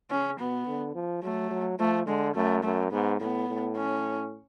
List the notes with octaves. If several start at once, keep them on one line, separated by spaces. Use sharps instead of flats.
C#3 C#4
B2 B3
D3
F3
F#3 A3
F#3
F3 A3
D3 G#3
F#2 A3
F#2 A3
G#2 B3
A2 B3
A2
C#4